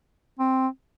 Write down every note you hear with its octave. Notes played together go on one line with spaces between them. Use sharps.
C4